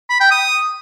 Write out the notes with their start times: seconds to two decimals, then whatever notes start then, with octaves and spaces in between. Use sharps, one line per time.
0.10 B5
0.20 G5
0.31 D#6